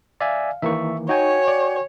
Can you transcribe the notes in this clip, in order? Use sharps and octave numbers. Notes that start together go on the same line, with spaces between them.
D5 E5 F5 G#5
D#3 E3 A#3 E5 C#6
D#4 F#4 C#5 G5 G#5
D5